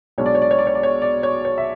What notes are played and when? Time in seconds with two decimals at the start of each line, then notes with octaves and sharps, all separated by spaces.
0.18 B1 B2 G#3 D4 C#5
0.26 D5
0.35 C#5
0.42 D5
0.51 C#5
0.59 D5
0.67 C#5
0.75 D5
0.83 C#5
1.02 D5
1.23 C#5
1.45 C#5
1.58 E5